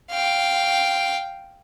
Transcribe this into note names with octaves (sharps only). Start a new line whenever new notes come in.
F5 G5